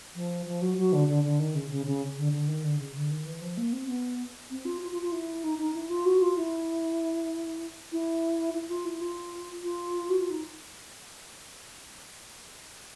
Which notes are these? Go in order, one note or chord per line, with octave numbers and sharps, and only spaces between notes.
F3
F3
F#3
F#3
D3
D3
D3
D#3
C#3
C#3
C#3
D3
D3
D#3
D3
C#3
D3
D#3
E3
F3
A#3
C4
B3
C4
F4
F4
F4
F4
E4
D#4
D#4
E4
F4
F#4
F4
E4
E4
E4
F4
E4
F4
F4
F#4
F4
D#4